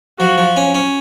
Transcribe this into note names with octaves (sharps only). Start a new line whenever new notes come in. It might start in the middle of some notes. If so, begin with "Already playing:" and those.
F3 F#4
F3
C#4
C#4